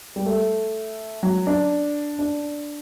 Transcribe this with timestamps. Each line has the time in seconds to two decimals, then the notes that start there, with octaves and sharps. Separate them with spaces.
0.16 G3
0.26 A3
1.23 F#3
1.47 D4
2.19 D4